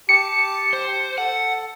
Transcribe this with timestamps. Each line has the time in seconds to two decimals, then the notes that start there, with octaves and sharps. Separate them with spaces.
0.09 G4 A5 C#7
0.73 C5
1.18 A4 F#5